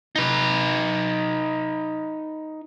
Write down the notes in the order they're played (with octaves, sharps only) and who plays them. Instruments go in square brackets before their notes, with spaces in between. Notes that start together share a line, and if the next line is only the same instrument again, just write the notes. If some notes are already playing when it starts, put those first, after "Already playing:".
[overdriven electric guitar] D#4 B4